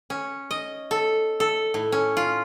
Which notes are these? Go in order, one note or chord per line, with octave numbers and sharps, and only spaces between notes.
C#4
D#5
A4
A4
A2
C#4
F4